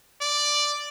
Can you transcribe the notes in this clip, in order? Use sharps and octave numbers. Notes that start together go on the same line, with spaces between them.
D5